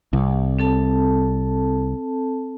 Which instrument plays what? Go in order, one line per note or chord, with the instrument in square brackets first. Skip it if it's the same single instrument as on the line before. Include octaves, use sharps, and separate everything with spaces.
[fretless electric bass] C2
[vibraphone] C4 A4 A5